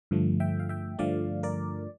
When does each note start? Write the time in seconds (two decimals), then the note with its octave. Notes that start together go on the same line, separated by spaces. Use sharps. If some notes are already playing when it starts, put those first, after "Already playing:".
0.11 G2 D3 F3 A3
0.40 E5 G5
0.60 F5
0.69 E5 G5
0.99 G2 D3 F3 A3 D5 F5
1.43 A#4 D5